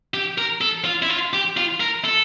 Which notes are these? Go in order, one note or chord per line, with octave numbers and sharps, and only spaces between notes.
G4
A#4
A4
F4
E4
F4
G4
F4
A#4
A4